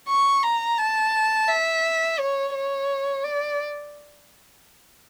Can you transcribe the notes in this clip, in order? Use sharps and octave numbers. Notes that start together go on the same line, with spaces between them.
C#6
A#5
A5
E5
C#5
C#5
D5